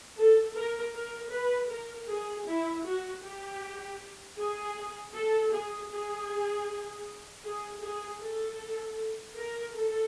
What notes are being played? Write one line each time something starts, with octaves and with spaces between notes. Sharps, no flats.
A4
A#4
A#4
B4
A#4
G#4
E4
F#4
G4
G#4
A4
G#4
G#4
G#4
G#4
A4
A#4
A4